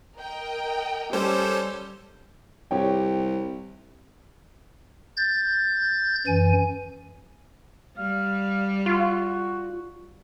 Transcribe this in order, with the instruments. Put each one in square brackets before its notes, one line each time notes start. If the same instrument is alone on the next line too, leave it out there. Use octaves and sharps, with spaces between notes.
[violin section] A#4 D#5 G5
[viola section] G3 [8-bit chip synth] C#4 A4 C5
[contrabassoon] C2 [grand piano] G4 C#5 G5
[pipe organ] G6 A6
F#2 E3 G#5
[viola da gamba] G3 [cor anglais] F5
[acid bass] F4 [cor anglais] F#4